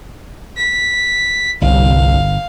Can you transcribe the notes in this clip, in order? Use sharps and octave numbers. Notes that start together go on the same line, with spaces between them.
B6
G1 C2 F5